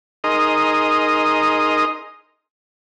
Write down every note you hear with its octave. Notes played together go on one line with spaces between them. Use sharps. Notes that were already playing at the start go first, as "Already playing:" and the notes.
D#4 G#4 A#4 D#5 C6 D#6